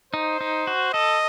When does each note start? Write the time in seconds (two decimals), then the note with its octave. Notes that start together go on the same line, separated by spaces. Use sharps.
0.13 D#4 C5
0.41 D#4
0.67 F#4
0.93 A4 D#5